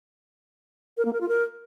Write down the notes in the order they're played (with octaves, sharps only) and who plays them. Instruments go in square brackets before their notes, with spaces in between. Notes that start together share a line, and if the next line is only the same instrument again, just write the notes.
[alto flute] A#4
A#3
A#4
F4
A#4